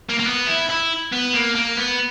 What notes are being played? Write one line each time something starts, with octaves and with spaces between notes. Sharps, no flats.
A#3
A#3
B3
E4
E4
B3
A#3
A#3
B3